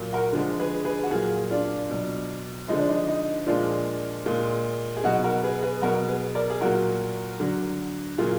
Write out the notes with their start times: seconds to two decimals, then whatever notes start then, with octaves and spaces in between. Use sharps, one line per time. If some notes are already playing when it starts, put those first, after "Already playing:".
Already playing: A#2 F#3
0.13 F#4 A#4
0.32 D3 F3 G#3
0.60 G#4 B4
0.85 G#4 B4
1.03 F#4
1.11 A#2 F#3 F4 G#4
1.51 D4 F4
1.90 B2 F#3
2.68 D3 F3 G#3 D#4
2.79 D4
2.89 D#4
3.08 D#4
3.46 A#2 F3 G#3 D4 F4
4.26 A#2 G#3
4.97 G#4
5.04 B2 F#3 D#4 F#4
5.24 F#4 A#4
5.43 G#4 B4
5.62 G#4 B4
5.82 B2 F#3 F#4 A#4
6.08 G#4 B4
6.35 A#4 D5
6.50 G#4
6.61 A#2 F#3 F#4 A#4
7.40 D3 F#3
8.18 A#2 F#3 F4 G#4